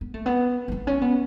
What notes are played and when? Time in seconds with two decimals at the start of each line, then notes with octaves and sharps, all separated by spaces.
0.01 B3
0.14 A3
0.26 B3
0.68 A3
0.72 B3
0.87 C#4
1.02 B3